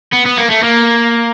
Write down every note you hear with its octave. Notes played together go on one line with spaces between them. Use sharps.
B3
B3
A#3
A3
A#3